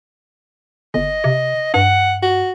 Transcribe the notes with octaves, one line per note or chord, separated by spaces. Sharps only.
G1 D#5
C3
G2 F#5
F#4